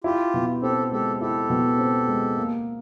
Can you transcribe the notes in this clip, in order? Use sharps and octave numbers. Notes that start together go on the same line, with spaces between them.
E4 F4 G4
B2
C4 G4 A4
G#3 G4 A4
E4 G4 A4
B2
C4
G#3
A#3